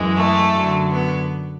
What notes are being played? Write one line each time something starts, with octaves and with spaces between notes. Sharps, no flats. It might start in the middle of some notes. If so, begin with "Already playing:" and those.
Already playing: F#2 E3 G#3
A3
F#2 D3 F#3
B3